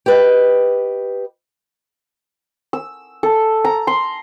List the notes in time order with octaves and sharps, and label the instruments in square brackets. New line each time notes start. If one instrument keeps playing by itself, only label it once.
[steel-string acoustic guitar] G4 B4 D#5
[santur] E6
A4
A#5
C6